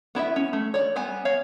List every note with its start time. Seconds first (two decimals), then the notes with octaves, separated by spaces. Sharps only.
0.15 B3 E4 D5 E5
0.36 C#4
0.53 A3
0.74 C#5 D5
0.96 G3 B3 G#5
1.25 C#5 F5